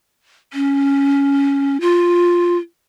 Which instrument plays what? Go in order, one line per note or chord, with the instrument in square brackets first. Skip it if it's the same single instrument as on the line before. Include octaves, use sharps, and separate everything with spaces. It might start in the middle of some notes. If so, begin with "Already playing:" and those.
[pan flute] C#4
F4